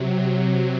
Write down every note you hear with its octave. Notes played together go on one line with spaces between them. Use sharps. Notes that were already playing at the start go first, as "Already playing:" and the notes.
Already playing: C3 F#3